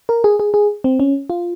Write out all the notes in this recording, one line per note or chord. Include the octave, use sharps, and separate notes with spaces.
A#4
G#4
G#4
G#4
C4
C#4
F4